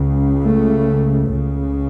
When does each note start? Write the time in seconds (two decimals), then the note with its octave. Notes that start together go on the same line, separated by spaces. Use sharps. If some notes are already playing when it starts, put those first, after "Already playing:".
Already playing: C#2 C#3
0.42 A3
1.25 C#2 C#3